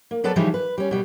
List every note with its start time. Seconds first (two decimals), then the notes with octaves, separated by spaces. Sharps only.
0.11 A#3
0.24 F#3 B3 A4 B4 D5 A5
0.36 C#3 E3 F3 G3 D#4
0.54 B4
0.78 G3 C#4
0.91 B2 G3